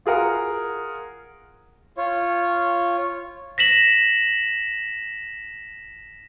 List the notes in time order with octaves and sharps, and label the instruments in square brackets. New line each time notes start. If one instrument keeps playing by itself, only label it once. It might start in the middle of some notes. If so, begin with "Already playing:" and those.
[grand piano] F4 G#4 A#4 F#5
[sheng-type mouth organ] F4 C#5
[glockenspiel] A#6 B6 E7 F#7